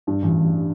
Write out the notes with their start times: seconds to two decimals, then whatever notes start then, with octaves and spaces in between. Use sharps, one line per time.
0.07 G2
0.22 A1
0.38 A1